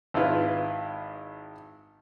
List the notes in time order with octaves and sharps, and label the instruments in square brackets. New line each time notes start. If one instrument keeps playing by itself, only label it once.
[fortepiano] G#1 E4 F4 B4